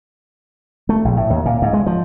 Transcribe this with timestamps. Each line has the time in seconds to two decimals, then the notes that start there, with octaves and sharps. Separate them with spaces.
0.89 A3
1.05 A#1
1.17 A2
1.30 D#2
1.46 A#2
1.62 G#2
1.73 G#3
1.86 F3